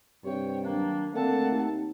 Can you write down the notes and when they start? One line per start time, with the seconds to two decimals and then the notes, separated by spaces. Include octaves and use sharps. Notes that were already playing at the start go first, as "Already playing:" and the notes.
0.25 G2 C3 C#5 G5
0.64 D#3 F#3 A#3 D4
1.14 D3 A3 A#3 C4 F#5 A5
1.51 D#2